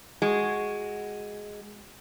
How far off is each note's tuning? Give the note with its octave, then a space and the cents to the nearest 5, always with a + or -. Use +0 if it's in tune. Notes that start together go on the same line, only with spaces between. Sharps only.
G#3 +0 F#4 +0